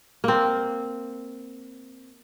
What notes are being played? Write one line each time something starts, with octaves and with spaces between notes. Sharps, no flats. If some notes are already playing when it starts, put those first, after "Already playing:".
A#3 C4